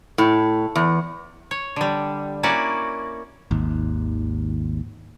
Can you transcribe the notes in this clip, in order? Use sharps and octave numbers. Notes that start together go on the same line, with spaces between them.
A2
E2
C#5
D3 G3
A#3 C#4 E4 F#4 D5
G#1 D#2